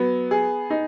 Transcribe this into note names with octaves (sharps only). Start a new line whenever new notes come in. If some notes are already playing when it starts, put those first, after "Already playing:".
Already playing: F#3 B3
G#4
D#4